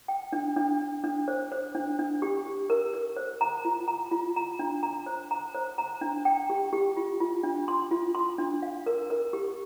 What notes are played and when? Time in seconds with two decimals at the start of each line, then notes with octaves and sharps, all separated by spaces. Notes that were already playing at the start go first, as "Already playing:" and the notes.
0.08 G5
0.32 D4
0.56 D4
0.79 D4
1.04 D4
1.28 C5
1.52 C5
1.75 D4
1.99 D4
2.22 G4
2.46 G4
2.70 A#4
2.94 A#4
3.17 C5
3.41 A#5
3.65 F4
3.88 A#5
4.11 F4
4.36 A#5
4.59 D4
4.83 A#5
5.06 C5
5.31 A#5
5.54 C5
5.78 A#5
6.01 D4
6.25 G5
6.50 G4
6.73 G4
6.97 F4
7.20 F4
7.43 D4
7.68 C6
7.91 F4
8.15 C6
8.38 D4
8.63 F5
8.86 A#4
9.10 A#4
9.33 G4